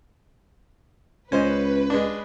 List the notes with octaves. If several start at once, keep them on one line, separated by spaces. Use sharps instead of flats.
C#2 C#4 B4 C5 D#5
G#3 D4